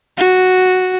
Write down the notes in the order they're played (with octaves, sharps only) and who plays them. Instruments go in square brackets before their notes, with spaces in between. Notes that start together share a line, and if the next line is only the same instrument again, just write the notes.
[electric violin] F#4